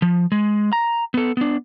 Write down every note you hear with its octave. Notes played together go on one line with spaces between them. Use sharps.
F3
G#3
A#5
B3 A4
B3 D4